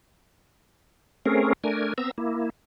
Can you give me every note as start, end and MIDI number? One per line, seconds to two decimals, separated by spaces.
1.26 1.53 57
1.26 1.53 60
1.26 1.53 61
1.26 1.53 68
1.26 1.53 70
1.64 1.93 57
1.64 1.93 62
1.64 1.93 70
1.64 1.93 80
1.98 2.11 59
1.98 2.11 60
1.98 2.11 82
1.98 2.11 88
2.18 2.50 58
2.18 2.50 64